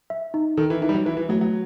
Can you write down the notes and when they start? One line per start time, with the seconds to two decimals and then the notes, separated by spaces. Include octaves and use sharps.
0.10 E5
0.34 D#4
0.57 D#3 A4
0.70 E3
0.82 E3 D#4
0.89 G3
0.94 F#3
1.06 E3 B4
1.17 E3
1.29 F#3 A3
1.41 F#3